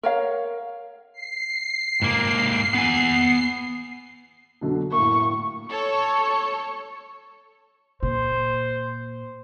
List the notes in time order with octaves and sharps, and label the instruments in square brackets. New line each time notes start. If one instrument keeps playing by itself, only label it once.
[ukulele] A#4 C#5 F5
[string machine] C7
[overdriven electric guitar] G#2 A#3
B3 G#5
[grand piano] B2 D3 F#3
[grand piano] A2 A#3 [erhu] C#6
[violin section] A4 C#5 [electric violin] C#6
[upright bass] A#2 [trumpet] C5